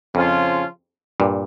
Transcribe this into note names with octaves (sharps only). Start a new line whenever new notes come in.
F2 C#3 F3 C#4 F4
G2 A#2